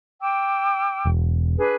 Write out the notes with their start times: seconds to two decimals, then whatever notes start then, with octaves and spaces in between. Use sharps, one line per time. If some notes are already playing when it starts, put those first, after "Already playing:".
0.20 G5 D6 E6
1.05 E1
1.57 D4 G#4 B4